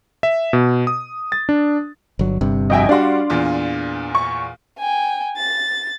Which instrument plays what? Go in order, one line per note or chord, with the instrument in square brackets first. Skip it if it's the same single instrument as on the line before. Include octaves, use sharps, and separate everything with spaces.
[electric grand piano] E5
B2
D#6
A6
D4
[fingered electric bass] G1 F#3
G1 G2 C3
[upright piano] F2 F#4 E5 [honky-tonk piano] D#5 G5 G#5
[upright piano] G3 F#4 [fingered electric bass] D4 [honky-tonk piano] D5 F5 C6
[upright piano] E2 A#2 F4
[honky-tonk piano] C#6
[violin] G5 G#5
A6